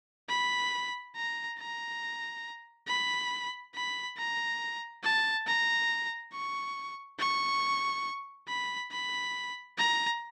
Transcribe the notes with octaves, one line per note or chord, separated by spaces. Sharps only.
B5
A#5
A#5
B5
B5
A#5
A5
A#5
C#6
C#6
B5
B5
A#5